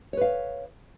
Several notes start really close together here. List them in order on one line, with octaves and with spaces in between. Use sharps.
C#5 B4 F5